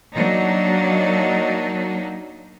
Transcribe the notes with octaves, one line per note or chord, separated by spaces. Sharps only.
F#3 A#3 D4 D#4